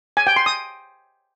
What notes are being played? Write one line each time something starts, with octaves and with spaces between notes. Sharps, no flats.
G#5
G5
C6
D#6